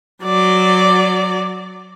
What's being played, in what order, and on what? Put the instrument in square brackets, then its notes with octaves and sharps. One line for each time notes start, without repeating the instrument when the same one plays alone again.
[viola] F#3 D5